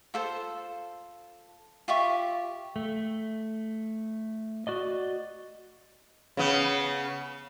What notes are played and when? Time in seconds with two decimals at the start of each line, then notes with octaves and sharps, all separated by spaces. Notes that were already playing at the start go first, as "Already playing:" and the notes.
0.14 F4 A4 C5
1.88 F4 G4 E5 C#6
2.76 A3
4.67 F#4 D5 D#5
6.37 C#3 B3